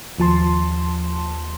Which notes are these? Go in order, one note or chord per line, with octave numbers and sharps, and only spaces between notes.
D#2 F3 A5 C6